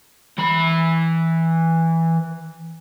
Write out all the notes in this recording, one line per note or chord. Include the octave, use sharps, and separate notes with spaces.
E3 B5